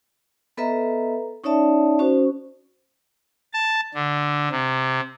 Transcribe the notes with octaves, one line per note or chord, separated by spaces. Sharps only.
B3 A4 B4 D#5 E5 A#5
C#4 D#4 C#5 D5 E5 A5
C#4 F#4 C5
A5
D3
C3